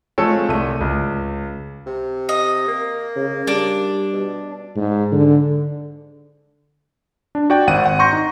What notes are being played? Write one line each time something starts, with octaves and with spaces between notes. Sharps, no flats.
F3 G#3 A3 C4 A4 C#5
C2 A3 D#7
C#2
C3
D#5
A#3
C#3
G3 D4
B2
G#2
D3
D4
F#4 D5 G5
G#1 F#5 D#7
F#5
A#5 C6 C#6 G6 A#6
D#4